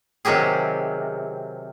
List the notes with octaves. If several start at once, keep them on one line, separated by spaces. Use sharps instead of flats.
C3 D#3 F#3 G4 G#4